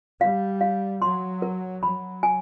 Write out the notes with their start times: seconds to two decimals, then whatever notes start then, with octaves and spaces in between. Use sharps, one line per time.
0.21 G3 F5
0.61 F5
1.02 F#3 C6
1.42 A#4
1.82 F#3 B5
2.23 G#5